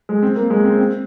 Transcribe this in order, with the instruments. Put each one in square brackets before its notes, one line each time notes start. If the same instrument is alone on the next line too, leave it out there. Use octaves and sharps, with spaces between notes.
[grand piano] G#3
C4
A#3
G#3
C4
C4